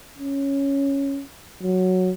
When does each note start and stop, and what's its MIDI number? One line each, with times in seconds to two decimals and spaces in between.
0.18 1.22 61
1.63 2.12 54